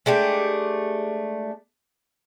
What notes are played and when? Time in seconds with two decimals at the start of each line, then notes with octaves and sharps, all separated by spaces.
0.06 G#3 A3 D4 G4